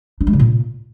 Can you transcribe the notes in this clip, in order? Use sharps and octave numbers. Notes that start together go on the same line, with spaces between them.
D4
G#3
C#3
A#2